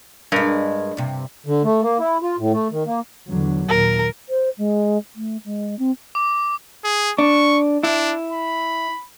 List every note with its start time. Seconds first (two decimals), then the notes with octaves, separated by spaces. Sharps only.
0.32 G2 G#3 A#4
0.97 G2 C3
1.46 D3
1.64 A3
1.82 A#3
1.99 E4
2.22 F4
2.38 A2
2.53 A3
2.71 D#3
2.86 A#3
3.27 E2 D3 F#3
3.69 D#2 A#2 A#4
4.29 C5
4.58 G#3
5.16 A3
5.45 G#3
5.79 C4
6.15 D6
6.84 G#4
7.18 D4 C#6
7.83 D4 E4
8.33 B5